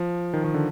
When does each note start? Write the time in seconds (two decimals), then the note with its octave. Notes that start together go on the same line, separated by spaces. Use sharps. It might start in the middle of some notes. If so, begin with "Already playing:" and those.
Already playing: F3
0.33 D#3
0.44 D#3
0.54 D3